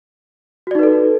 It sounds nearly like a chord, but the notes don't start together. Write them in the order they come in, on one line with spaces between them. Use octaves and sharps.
F#4 D5 D#4 B4 A4